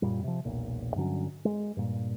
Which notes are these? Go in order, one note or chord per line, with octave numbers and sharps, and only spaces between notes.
F#2 A#2 G3
C3 F3
E1 B1 A#2
G2 D3 F#3 C#4
G#3
G2 A#2